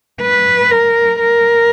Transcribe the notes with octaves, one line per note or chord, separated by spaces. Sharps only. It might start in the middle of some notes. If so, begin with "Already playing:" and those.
B4
A#4
A#4